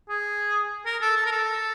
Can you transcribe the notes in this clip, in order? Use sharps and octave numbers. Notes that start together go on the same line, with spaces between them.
G#4
A#4
A4
A4
A#4
A4